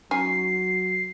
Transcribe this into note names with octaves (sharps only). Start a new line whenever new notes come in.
F#3 C#4 D#4 G#5 C7